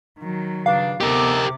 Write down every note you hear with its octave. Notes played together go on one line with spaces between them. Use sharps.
D#3 F#3
G2 C#3 D4 F5
C3 D#3 B3 G4 A4 A#4 D6